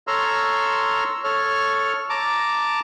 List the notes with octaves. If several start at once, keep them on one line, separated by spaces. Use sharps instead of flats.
A4 C#5 A#5 C6 E6 F6
A4 C#5 F6
A5 A#5 D6